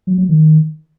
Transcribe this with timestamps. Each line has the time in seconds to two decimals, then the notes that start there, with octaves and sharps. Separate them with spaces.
0.07 F#3
0.18 F#3
0.29 D#3